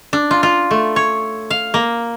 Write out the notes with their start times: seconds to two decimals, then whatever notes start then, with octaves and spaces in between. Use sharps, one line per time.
0.13 D4
0.31 F4
0.43 F4
0.71 A3
0.96 C#5
1.50 F5
1.74 A#3